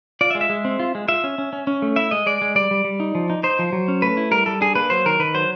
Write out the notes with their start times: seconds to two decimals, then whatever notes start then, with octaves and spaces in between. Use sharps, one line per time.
0.21 F4 D5
0.31 E5
0.35 G#3
0.41 E5
0.50 G#3
0.65 C4
0.79 F4
0.95 G#3
1.08 F4 E5
1.24 C#4
1.38 C#4
1.53 C#4
1.67 C#4
1.82 A3
1.96 E4 E5
2.11 G#3 D#5
2.26 G#3 D5
2.42 G#3
2.55 G3 D5
2.71 G3
2.84 G3
3.00 D#4
3.15 F3
3.30 D#4
3.43 D#4 C5
3.59 F3
3.73 F#3
3.88 C#4
4.02 A3 B4
4.17 E4
4.31 G3 A#4
4.46 G3 A4
4.61 D4 G#4
4.75 A#3 B4
4.90 F#3 C5
5.06 D#3 A#4
5.19 D#3 B4
5.34 F#3 C5